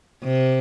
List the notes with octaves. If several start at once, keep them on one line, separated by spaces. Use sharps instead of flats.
C3